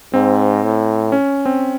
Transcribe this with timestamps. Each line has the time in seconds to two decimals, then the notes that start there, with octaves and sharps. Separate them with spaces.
0.14 G#2 C4
0.64 A2
1.12 C#4
1.46 C4